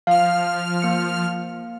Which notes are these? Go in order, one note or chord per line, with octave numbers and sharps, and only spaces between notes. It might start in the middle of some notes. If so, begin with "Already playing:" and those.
F3 F5 F6
A#3 C#7